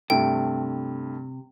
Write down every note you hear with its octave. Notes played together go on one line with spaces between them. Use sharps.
G2 C3 A3 G5